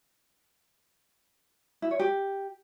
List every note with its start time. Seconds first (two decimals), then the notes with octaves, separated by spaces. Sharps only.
1.82 E4
1.91 C#5
2.00 G4